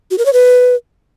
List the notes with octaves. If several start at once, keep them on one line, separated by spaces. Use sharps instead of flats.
F#4
A#4
C#5
B4